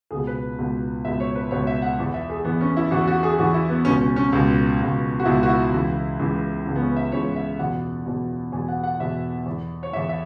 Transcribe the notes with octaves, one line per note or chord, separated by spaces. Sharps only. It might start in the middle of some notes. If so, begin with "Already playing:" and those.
C#2 B2 G#4
B4
C#2 B2
C#2 B2 E5
C#5
B4
C#2 B2 C#5
E5
F#5
E2 E3
E5
G#4
E2 E3 B3
C#4
E4
E2 E3 F#4
F#4
G#4
E2 E3 F#4
E4
B3
C#2 B2 C#4
C#4
C#4
C#2 B2
C#2 B2
F#4
C#2 B2 E4
F#4
E4
C#2 C#3 E3
C#2 C#3 E3
C#2 C#3 E3
B3
C#4
E5
C#2 C#3 E3 C#5
E5
E2 B2 F#5
E2 B2
E2 B2 G#5
F#5
F#5
E2 B2 E5
E2 E3
C#5
E2 E3 E5
E5